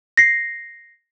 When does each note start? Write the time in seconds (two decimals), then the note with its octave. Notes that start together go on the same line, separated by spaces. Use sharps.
0.17 A#6 C7